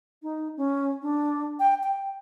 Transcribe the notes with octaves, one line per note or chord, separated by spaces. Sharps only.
D#4
C#4
D4
G5
G5